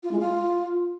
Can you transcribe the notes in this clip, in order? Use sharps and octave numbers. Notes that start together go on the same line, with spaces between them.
F4
G#3
F4